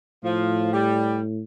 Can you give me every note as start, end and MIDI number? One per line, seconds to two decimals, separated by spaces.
0.24 1.42 45
0.24 0.72 53
0.72 1.17 55